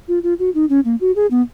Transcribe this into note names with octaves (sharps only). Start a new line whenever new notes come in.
F4
F4
F#4
D#4
C#4
A#3
F#4
G#4
B3